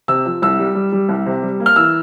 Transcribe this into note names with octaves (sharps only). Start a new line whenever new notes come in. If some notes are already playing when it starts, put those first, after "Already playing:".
C3 E6
F3
C2 E6
G3
G3
G3
C2
C3
G3
A#3
F6
E3 E6